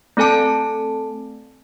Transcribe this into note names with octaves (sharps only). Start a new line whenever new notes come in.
A3 C4 A4 G#5 A5